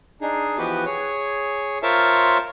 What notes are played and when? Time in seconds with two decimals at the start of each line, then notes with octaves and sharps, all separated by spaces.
0.22 D4 D#4 G#4
0.58 E3 F3 B3 F#4 G4 B4
0.86 G#4 C#5
1.83 F4 A#4 C5 C#5 E5 A5